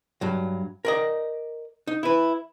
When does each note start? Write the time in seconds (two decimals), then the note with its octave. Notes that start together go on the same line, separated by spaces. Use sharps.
0.21 G2 F#3
0.85 A#4 D5 D#5
1.87 D#4
2.03 E4 B4